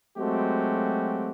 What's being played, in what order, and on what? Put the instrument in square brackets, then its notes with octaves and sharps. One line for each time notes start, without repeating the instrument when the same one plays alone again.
[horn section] F#3 G#3 A3 C4 F#4 G4